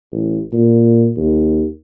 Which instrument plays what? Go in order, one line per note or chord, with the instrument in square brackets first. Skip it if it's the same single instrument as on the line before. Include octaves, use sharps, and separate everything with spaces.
[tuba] A1
A#2
D#2